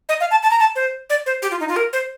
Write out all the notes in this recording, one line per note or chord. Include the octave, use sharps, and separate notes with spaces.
D#5
F5
A5
A5
A#5
A5
C5
D5
C5
G4
F4
D#4
F4
A#4
C5